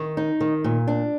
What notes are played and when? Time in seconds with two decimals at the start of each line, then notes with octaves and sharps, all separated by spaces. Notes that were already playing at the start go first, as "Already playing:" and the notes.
Already playing: D#3
0.17 D#4
0.41 D#3
0.64 A#2
0.88 D4